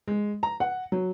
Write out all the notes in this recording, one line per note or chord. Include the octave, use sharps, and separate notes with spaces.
G#3
A#5
F#5
F#3